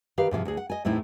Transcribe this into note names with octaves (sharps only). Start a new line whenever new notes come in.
D#3 G4 B4 F5
G#2 C3 E3 F3
D2 G#4
F#5
D#5 G#5
E2 A2 C4 D#4 E4